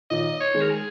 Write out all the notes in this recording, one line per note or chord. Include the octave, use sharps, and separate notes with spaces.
A#2 D#3 D#5
C#5
D#3 G#3
A#4
G#4